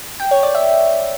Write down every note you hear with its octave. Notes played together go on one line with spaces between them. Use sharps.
G5
C#5
D5
E5